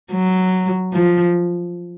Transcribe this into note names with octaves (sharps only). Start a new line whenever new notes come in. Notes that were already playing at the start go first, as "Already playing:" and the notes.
F#3
F3